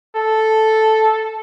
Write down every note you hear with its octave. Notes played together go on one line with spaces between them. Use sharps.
A4